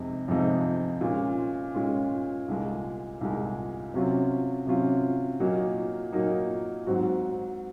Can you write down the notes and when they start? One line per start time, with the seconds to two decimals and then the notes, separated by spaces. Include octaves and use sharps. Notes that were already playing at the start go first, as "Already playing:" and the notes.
Already playing: F2 C3 G#3 D#4
0.28 F2 C3 F3 G#3 D#4
1.01 A#2 G#3 C#4 F4
1.74 A#2 G#3 C#4 F4
2.48 C2 A#2 G#3
3.21 C2 A#2 G#3
3.94 C3 F#3 C#4 F4
4.67 C3 F#3 C#4 F4
5.40 A#2 F#3 A#3 D#4
6.13 A#2 F#3 A#3 D#4
6.86 G#2 F#3 C4 F#4